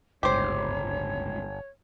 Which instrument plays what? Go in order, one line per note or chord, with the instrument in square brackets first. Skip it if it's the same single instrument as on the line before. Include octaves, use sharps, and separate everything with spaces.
[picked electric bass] D1 C#2 G#2 [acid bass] G1 [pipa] G4 C5 [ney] C#5